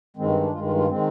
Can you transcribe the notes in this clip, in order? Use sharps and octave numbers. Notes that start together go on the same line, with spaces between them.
G2 D#3 G#3 C4
C4
D4
G2 D#3 G#3 F4
F4
F4
D#3 G#3 C4